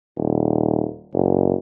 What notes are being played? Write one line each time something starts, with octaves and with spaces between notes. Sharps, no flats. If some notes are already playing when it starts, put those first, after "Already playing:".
D#1
F#1